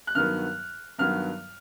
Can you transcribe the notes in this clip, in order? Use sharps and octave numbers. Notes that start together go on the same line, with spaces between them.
F#6
G2 D#3 F#3 B3 F6
G2 D#3 F#3 B3 F6